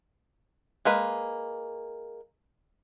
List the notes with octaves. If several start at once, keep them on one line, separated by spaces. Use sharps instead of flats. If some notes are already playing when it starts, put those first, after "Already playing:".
G#3 A#3 B4